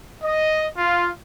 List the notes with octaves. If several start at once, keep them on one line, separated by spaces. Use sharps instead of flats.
D#5
F4